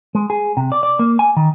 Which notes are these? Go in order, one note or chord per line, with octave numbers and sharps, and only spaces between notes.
G#3
G#4
C3
D5
D5
A#3
G#5
D#3